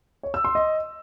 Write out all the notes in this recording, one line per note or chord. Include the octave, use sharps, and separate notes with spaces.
C#5
E6
C6
D#5